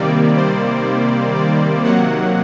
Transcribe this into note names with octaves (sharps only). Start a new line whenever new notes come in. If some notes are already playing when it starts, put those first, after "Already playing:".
Already playing: C3 D#3 G3 A#3 D5
C5
D5
C3 D#3 F#3 A#3 F#5